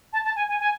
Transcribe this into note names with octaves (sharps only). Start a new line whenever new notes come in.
A5
A5
G#5
G#5
G#5